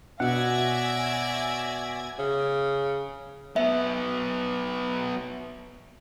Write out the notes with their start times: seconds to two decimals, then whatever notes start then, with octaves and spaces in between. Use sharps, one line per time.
0.20 B2 C#5 D5 E5 F#5 G#5 G#6 A#6
2.19 C#3
3.56 F#3 B3 E5